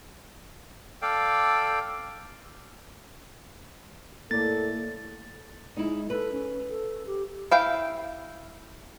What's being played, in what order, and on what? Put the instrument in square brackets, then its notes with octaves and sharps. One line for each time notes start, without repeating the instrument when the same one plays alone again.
[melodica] A4 D5 F5 G5
[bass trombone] A2 [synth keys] A#3 D5 [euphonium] A4 [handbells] A6
[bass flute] G#3 [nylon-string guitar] D#4 E4
[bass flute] A4 [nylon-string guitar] B4
[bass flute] C#4
A4
G4
[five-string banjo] E4 F5 G5